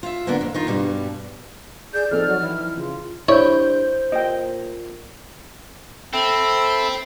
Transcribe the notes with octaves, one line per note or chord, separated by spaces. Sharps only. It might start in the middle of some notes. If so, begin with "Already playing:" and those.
F4 E5
D3 A#3 B3 D4
F2
D#3 D#4 F4
G2 B2 G3
G#4 D5 G6
F3 C4 D#4 A4 F6
F#3
E3 E4
C#3 F4
G2 E4 C5 C#5 G6
A#2 D#5 G5
C4 A4 E5 B5